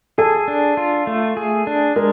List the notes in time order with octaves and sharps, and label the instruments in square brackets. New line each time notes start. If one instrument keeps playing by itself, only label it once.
[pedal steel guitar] G#4 [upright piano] A4
[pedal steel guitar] D4
F4
A3
G#4
D4
[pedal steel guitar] G#3 [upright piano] A#4